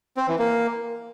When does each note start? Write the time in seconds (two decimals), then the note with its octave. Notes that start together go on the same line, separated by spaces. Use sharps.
0.17 C4
0.28 E3
0.39 A#3